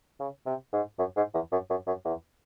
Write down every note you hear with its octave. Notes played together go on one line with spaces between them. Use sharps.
C#3
C3
G#2
F#2
G#2
E2
F#2
F#2
F#2
E2